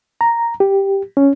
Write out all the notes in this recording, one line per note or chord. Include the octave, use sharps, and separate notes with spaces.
A#5
G4
C#4